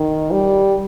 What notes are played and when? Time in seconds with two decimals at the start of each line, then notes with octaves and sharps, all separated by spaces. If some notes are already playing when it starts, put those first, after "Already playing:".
Already playing: D#3
0.31 G3